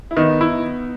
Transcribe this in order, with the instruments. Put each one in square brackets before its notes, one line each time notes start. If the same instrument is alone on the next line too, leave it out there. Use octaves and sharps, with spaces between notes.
[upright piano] E4
[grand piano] D#3 [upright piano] B3 D#4
[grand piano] E4